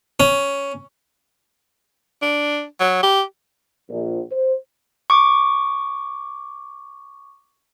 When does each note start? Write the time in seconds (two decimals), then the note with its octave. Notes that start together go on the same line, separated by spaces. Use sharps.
0.20 C#4
2.22 D4
2.80 F#3
3.03 G4
3.89 A#1
4.31 C5
5.10 C#6 D6